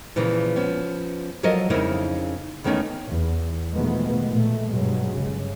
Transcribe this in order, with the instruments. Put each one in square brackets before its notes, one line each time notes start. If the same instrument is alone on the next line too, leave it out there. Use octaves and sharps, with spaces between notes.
[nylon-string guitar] A#2 C#3 E3 F3
F3 B3 C#4
F3 F#3 A4 A#4 D#5
F2 C#3 A#3 D#4 E4
E2 D#3 A3 B3 C#4 D#4
[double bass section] E2
B2 D#3 F3 G#3 A3 B3
A#2 A3
G2 B2 F#3 G#3
G1 C#3